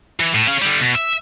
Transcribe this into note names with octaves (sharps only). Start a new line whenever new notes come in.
E3
A2
C#4 F5
D3 G3
B2
E5